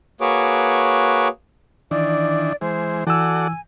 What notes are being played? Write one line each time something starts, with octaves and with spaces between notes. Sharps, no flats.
A#3 F#4 G#4 B4 C#5 D6
D#3 E3 D4 D5
E3 G#3 C5
E3 F#4 A4 D5 G#5 E6